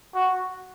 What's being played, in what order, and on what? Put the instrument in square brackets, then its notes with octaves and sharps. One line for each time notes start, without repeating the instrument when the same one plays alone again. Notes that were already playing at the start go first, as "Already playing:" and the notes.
[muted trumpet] F#4